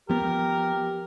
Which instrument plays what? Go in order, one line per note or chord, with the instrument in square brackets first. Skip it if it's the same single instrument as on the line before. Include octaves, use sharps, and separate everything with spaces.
[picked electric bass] F3 B3 [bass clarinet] G4 [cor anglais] A#4